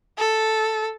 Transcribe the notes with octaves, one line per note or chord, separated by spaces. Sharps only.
A4